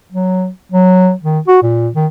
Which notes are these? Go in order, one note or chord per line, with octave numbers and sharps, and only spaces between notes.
F#3
F#3
D#3
F#4
A#2
D#3